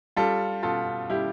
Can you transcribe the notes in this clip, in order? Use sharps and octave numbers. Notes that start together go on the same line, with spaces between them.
G3 F4 A4
B2 F4 A4
G3 E4 G4